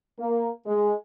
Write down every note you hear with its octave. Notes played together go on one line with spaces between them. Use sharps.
A#3
G#3